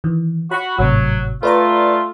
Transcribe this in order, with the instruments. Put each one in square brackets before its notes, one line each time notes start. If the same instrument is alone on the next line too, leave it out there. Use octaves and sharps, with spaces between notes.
[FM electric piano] D#3 E3
[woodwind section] F#4 [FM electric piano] B5 C#6
[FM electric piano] G#1 A2 C3 [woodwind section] F#3
[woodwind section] A3 F4 [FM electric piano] B4 D5 A#5